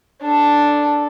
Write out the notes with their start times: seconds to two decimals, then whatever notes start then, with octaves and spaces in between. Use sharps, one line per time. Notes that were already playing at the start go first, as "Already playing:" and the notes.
0.22 D4 A4